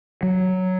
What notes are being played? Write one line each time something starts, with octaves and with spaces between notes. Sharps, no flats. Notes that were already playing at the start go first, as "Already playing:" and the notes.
F#3